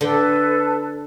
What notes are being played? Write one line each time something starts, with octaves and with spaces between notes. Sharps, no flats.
D3 A4 B4 G5